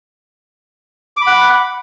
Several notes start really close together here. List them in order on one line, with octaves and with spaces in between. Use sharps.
D6 B5 F#5